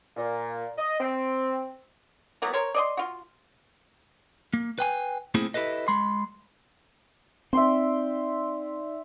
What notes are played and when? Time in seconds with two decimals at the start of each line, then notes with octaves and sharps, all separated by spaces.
0.17 A#2
0.78 D#5
1.00 C4
2.42 E3 F#3 A#3 B3
2.53 A#4 C5 C#5
2.74 D5 D#5 C6
2.97 F4 F#4
4.54 A#3
4.79 B4 G5 G#5
5.34 A3 A#3 C4 E4 G#4
5.54 E4 G4 A4 B4 D#5
5.88 G#3 B5 C6
7.53 C4 D#4 D5 E5 G5 C6